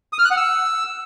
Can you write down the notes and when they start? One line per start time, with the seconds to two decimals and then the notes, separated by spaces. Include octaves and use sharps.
0.13 D#6
0.19 F6
0.25 F#6
0.31 F#5
0.37 E6